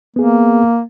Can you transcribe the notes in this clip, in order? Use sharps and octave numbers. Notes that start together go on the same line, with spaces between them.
A#3 B3 G#4